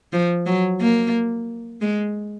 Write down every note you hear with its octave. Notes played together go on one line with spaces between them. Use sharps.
F3
F#3
A#3
G#3